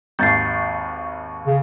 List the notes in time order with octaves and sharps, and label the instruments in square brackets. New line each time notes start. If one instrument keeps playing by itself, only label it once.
[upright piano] G#1 D#2 [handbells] G6 A6 C7
[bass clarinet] C#3